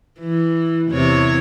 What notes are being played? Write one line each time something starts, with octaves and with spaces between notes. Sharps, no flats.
E3
E2 C3 C#5